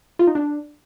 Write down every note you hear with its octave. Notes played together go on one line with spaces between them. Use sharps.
F4
D#4
D4